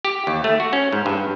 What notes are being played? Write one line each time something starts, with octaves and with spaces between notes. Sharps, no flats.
G4
D#2
A3
F#4
C#4
G#2
G2